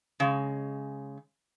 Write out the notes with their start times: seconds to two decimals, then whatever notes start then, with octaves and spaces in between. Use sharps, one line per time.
0.20 C#3 G#3